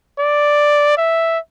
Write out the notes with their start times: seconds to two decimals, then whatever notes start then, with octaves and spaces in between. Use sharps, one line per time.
0.19 D5
0.97 E5